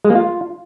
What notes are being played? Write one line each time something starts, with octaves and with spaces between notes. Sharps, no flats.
G#3
A#3
F4